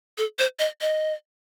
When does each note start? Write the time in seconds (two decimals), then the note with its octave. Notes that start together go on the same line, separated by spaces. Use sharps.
0.18 A4
0.39 C5
0.59 D#5
0.81 D#5